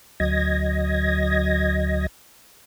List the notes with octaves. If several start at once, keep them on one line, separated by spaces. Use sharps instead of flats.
D2 F#3 D#5 G#6 A#6